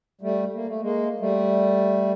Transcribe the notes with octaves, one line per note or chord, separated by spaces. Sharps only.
G3 A3
A#3
A3
G#3 A#3
G3 A3